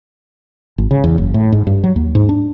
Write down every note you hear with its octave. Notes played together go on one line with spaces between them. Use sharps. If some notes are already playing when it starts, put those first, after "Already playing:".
G#1
C#3
E2
F#1
A2
G#2
G2
F#3
D#2
G#2
D4